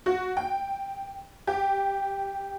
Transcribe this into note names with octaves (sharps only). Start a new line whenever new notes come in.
F#4
G5
G4